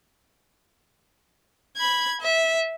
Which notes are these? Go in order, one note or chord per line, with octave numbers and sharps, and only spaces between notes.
B5 G#6
E5